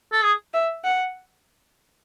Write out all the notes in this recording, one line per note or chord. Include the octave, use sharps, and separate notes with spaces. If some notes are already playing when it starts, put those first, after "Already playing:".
A4
G#4
E5
F#5